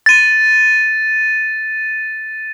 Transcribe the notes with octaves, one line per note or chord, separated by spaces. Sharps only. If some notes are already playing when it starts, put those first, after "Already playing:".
A6 D#7